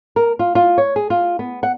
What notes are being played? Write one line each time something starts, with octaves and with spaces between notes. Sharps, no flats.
A#4
F4
F4
C#5
G#4
F4
B3
F#5